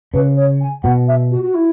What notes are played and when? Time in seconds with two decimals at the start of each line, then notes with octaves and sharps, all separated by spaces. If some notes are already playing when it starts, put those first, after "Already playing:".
0.14 C#3 B4
0.37 C#5
0.61 G#5
0.83 B2 F#5
1.08 E5
1.31 F#4
1.42 F#4
1.54 E4